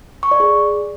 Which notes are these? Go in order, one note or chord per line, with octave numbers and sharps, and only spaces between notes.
C#6
D5
G#4